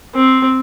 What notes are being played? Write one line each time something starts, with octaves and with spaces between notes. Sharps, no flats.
C4